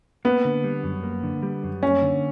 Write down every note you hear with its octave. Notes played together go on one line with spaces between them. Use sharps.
A#3 B3
D3
G3
F#2
A#3
D3
G3
F#2
A#3 C#4
D3